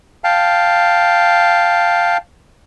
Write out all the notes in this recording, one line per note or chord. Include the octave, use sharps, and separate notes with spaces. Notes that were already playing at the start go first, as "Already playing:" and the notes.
F5 G5 A5